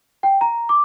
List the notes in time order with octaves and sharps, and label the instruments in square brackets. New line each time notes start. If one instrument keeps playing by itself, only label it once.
[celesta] G5
A#5
D6